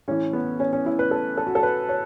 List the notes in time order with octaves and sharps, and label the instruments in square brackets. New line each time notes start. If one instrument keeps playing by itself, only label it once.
[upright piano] A2 E3 C#4
B3
C#4
C#4
E4
B4
A4
A4
F#4
A4
B4
C#5